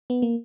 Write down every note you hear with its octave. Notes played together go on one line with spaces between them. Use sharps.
B3
A#3